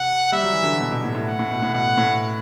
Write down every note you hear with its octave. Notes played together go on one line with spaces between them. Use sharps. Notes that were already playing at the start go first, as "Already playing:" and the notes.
Already playing: C3 F#5
G3 E5
F#3
E3
D3 F#3
B2
B2
A2
A2
F#5
A2
B2
A2
B2 F#5
A2